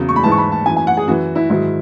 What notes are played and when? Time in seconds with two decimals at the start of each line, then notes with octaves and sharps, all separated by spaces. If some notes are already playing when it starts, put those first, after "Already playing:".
Already playing: E2 C#3 F#3
0.09 C#6
0.16 B5
0.23 G#2 E3 A5
0.32 C#6
0.38 B5
0.52 A5
0.66 F#2 E3 G#5
0.76 G#5
0.87 F#5
0.97 G#4
1.07 F#2 E3 F#4
1.35 E4
1.50 G#2 D#3 F#3 E4